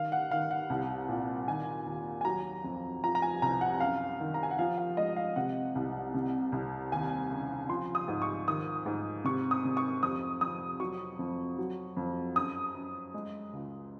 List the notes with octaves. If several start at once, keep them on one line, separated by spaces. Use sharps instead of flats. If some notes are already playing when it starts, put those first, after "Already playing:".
Already playing: D#3 F5
F#5
D#3 F5
F#5
C2
A#2
D#3 G#5
D#2
G#5
F#3 A#5
F2
F3 A#5
A#5
G#5
C2 A#5
F#5
F#2 F5
D#3
A#5
G#5
F#5
F3 F5
F5
G#3 D#5
F5
C3 F#5
C2
C3
C2
D#2 G#5
C#3
F3 C6
D#6
G#2
C#6
D#3 D#6
G#2
C3 C#6
D#6
C3
C#6
F2 D#6
F2 D#6
F#3 C#6
F2
F#3
F2
F#2 D#6
F#2
G#3
C#2